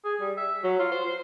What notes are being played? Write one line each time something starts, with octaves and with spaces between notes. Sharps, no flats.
G#4
G3
E5
F#3
F4
C5
C5